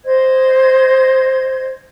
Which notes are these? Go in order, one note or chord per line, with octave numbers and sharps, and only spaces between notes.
C5 D#5 G#6